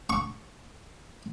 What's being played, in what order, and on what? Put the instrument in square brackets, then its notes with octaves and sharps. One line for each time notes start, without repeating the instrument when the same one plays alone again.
[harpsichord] C#6